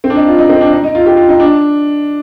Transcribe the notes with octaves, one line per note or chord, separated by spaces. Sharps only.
C4
D4
D#4
F4
D#4
C4
D4
D#4
D#4
F4
G4
F4
D#4
D4